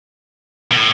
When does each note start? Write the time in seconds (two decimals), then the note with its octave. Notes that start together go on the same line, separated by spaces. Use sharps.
0.72 B2
0.76 A2